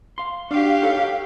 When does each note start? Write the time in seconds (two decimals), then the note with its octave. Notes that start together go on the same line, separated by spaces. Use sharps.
0.18 F5 C6
0.51 D4 F#4 G4 F5
0.82 D#4 A4 C#5